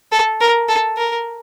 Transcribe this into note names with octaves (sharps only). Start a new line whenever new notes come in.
A4
A#4
A4
A#4